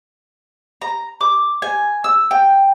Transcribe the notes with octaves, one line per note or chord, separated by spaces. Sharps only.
A#5
D6
G#5
E6
G5